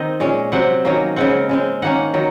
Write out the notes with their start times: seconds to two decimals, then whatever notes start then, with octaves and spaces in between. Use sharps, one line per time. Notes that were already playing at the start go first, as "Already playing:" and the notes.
Already playing: D#3 C4 D#5
0.20 A#2 G#3 C#4
0.52 C3 F#3 C4 F#5
0.85 D#3 F#3 A#3 C#4
1.16 C#3 G#3 C4 F#5
1.49 C#3 G#3 C4
1.82 D#3 A#3 C#4 F#5
2.14 D#3 F#3